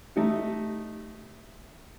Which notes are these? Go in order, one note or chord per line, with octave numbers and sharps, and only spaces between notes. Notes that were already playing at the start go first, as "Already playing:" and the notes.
A3 D#4 G4